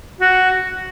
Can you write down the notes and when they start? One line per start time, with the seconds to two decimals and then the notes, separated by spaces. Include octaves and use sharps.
0.20 F#4